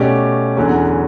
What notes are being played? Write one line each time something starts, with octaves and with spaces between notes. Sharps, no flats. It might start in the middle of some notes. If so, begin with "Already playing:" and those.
Already playing: B2 A3 C#4 G4 D5
E2 D3 F#3 C#4